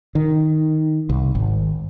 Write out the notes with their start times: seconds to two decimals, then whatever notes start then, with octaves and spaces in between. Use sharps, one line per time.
0.15 D#3
1.10 C2
1.35 G#1